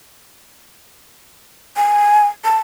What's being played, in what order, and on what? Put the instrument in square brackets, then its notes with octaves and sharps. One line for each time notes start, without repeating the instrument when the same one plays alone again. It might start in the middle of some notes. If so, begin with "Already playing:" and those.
[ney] G#5
A5